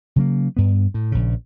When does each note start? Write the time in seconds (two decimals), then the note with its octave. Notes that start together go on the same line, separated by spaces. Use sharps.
0.16 C#3 F#3 A#3
0.57 G2 B3
0.94 A2
1.12 A#1 C#3